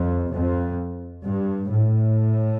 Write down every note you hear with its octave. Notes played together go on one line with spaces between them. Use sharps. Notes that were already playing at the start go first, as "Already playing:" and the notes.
Already playing: F2
F2
G2
A2